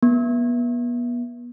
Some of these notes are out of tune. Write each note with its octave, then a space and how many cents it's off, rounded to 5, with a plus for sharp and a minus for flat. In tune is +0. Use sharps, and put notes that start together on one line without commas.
B3 -35